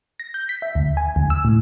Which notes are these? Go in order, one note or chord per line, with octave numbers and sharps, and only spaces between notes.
A#6
G6
B6
E5
D2
G#5
D2
E6
A2